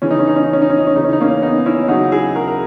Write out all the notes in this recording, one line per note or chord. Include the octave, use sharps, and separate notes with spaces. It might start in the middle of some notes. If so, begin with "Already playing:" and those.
C#3 E3 C#4
D#4
C#4
D#4
C#4
D#4
C#4
D#4
C#4
D#4
C#4
C#3 E3 D#4
C#4
D#4
A#3 C#4
B3 D#4
C#4 E4
C#3 F#3 D#4 F#4
E4 G#4
F#4 A#4
A#4